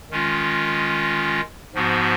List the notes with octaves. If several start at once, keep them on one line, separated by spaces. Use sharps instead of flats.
D#3 G#3 C#4 F4
G#2 F3 B3 F#4